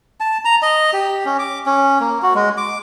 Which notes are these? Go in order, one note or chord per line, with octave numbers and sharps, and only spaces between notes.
A5
A#5
D#5
G4
C#4
D6
C#4
A#3
F#4
G#3
D6